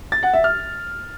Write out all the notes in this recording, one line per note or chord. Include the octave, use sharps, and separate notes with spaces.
A6
F#5
E5
F6